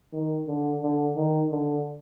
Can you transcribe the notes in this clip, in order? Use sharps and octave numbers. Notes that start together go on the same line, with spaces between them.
D#3
D3
D3
D#3
D3